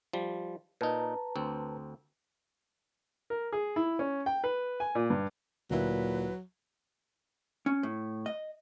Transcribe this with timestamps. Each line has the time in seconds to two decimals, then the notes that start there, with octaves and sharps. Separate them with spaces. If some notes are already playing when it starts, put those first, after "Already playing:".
0.13 F3 G3
0.81 A#2 D#4 B4 A5 A#5
1.36 D2 C4
3.30 A#4
3.53 G#4
3.76 E4
3.99 C#4
4.26 G5
4.44 B4
4.80 G#5
4.95 A#2
5.10 G2
5.71 D2 A#2 F#3 E4 B4
7.66 C#4
7.83 A2
8.26 D#5